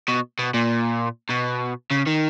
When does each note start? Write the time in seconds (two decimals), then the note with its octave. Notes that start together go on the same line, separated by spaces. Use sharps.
0.08 B2
0.39 B2
0.54 A#2
1.30 B2
1.91 C#3
2.07 D#3